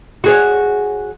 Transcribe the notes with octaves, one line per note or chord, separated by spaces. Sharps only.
F#4 G#4 C#5